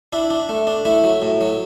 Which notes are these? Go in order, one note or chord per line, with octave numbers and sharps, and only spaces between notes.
D4 E4
D4
A3
D4
A3 E4
F#3
A2
F#3